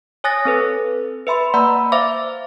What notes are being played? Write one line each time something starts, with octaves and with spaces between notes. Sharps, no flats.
C#5 G#5 D#6 F#6 A6 A#6
C4 A4 B4
B4 E5 B5 C6
A#3 D5 F#5 A#5 B5 E6
C5 E5 F5 D6